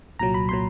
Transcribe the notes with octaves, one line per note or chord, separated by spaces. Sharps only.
C2 A#2 F#3 A#5
B5
A#2 F#3 C6